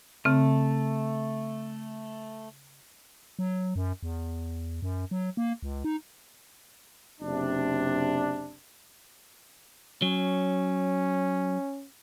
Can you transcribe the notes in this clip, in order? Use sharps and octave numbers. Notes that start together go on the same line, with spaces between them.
C#3 A3 C4
F#3
F#2
E2
F#2
F#3
A#3
C#2
D#4
F#1 C3 D4
F#3 C#4